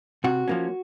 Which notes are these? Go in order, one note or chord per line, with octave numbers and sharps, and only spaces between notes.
C3 F#4
F3 A#3 C#4